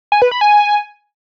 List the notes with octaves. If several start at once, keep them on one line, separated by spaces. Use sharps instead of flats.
G#5
B4
B5
G#5